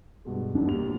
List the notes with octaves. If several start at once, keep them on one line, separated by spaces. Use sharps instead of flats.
G2 B2 G#3
F#2 B2 D4
D#2 G3 F7
F1 A#1 E2